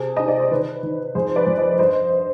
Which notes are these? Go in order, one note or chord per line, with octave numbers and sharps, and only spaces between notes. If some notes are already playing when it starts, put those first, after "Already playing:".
Already playing: C3 G#4
D#4 D#5
D5
C5
D#3 B4
D#3
F2 G#4 C5
B4 D5
F2
C5 D#5
G2 C5 D#5